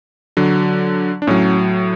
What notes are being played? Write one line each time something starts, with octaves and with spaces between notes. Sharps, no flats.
D3 F#3
D4
A2 F#3 C#4